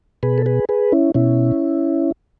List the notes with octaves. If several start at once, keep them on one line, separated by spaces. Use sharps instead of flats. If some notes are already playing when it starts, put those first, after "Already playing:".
B2 G#4 B4
A4
G#4 B4
G#4 B4
C#4 E4
B2 C#4 E4